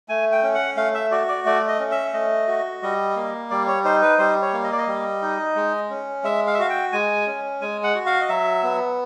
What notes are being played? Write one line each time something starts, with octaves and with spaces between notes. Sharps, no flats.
A3 G#5
G5
C#4
F#5
A3 F5
E5
F#4 D5
D5
A3 D5
D#5
C#4
E5
A3 D#5
F#4
G3 D#5
A#3
G3 D5
C#5
D#4 C5
B4
G3 C5
C#5
A#3
D#5
D5
D#5
G3
D#4
G#3
C#4
G#3 E5
F5
E5
F#4 F5
G5
G#3 G#5
C#4
G#3 G#5
F#5
F#4
F5
D#5
F#3 E5
B3